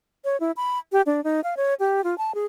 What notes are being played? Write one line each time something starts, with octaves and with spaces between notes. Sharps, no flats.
C#5
E4
B5
G4
D4
D#4
F5
C#5
G4
F4
A5
G#4